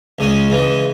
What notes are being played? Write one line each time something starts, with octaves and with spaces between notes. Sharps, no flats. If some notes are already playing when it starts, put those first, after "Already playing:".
C#2 C#3 G#3 C#4
C#3 E3 G#3